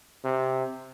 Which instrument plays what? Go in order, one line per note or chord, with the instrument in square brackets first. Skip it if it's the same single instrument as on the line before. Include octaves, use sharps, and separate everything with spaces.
[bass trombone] C3